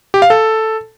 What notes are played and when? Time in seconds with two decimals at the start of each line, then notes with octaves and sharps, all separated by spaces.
0.14 G4
0.22 F5
0.30 A4